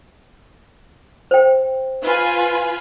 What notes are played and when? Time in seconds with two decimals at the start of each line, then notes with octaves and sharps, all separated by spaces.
1.31 C5 G5
2.03 F4 B4 G#5